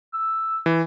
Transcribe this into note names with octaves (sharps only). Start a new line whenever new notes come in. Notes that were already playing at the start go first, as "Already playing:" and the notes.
E6
E3